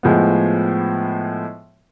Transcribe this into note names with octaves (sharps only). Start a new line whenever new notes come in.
A2 F3 G#3 B3